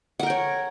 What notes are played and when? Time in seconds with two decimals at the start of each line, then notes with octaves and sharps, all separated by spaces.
0.20 F#5
0.23 A#4
0.26 G5
0.30 C#5